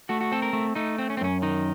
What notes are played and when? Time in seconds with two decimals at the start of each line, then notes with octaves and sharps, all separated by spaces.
0.09 A3 F#4
0.21 F#4
0.32 C4 A4
0.42 A#4
0.53 A3
0.75 A3 D#4
0.98 C4
1.10 C#4
1.17 C4
1.21 F#2 C#4
1.42 D#3 D#4